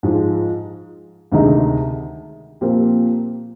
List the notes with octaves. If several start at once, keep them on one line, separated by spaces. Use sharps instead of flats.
G#2 F3 G#3
D2 C3 D#3 G#3 D#4
A#2 F3 C4 G4 A#4